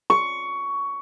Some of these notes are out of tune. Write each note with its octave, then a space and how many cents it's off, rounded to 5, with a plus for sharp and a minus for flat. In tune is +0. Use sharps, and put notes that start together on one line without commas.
C#6 +15